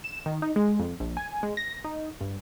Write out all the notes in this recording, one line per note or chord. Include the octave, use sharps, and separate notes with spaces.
E7
D#3
D#4
G#3
F2
A#1
G#5
G#3
A#6
D#4
G2